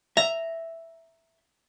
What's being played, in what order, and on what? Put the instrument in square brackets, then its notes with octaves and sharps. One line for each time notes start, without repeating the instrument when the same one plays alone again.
[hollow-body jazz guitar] E5 [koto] A#5